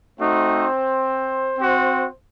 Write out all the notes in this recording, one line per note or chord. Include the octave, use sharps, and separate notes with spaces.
A3 C4 D#4 F#4 C5
C4 F#4